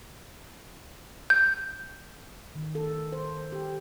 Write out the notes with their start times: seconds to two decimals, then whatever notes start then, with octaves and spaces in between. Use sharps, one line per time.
1.30 G6
2.55 D#3
2.75 A4
3.12 C5
3.52 G4